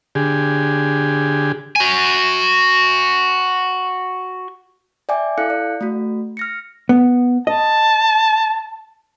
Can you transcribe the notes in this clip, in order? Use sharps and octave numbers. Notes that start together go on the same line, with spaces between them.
D3 G4 G#4
F#4 G#5
D5 E5 G5 G#5 D6
E4 A4 F5 F#6 C#7
D5
A3 F#4
F6 A#6 C#7
B3
D#5 A5